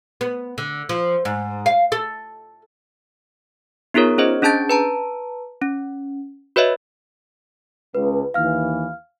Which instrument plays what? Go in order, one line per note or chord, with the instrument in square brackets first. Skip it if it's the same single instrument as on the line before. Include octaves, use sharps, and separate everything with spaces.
[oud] B3
D3
F3
G#2
F5
A4
[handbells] B3 D#4 F4 G#4 A#4 C#5
C#4 G#4 C5 D#5
C#4 D4 G#4 A5 G6 A6
B4 A5 A#5
C#4
F#4 B4 C#5 D#5 E5
[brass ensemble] C#2 [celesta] B4
[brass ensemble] D#2 E3 [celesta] F5 F6